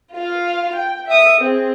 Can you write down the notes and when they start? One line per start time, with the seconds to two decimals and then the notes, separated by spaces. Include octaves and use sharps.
0.13 F4 F5
0.75 G5
1.07 E5 D#6
1.41 C4 G#4